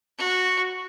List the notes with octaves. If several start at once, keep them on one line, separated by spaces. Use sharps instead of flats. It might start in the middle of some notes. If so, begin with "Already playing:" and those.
F#4